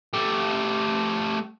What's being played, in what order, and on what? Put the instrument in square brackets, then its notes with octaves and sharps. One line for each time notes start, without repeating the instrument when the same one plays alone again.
[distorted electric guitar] A3 G4